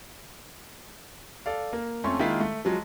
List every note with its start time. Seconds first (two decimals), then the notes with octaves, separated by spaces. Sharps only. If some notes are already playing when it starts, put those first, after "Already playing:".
1.46 A4 D5 F5
1.73 A#3
2.04 F2 A3 C#4 C6
2.19 D#3 G#3 A#3 E4 F4 B6
2.40 A3
2.65 F3 F#3 G#3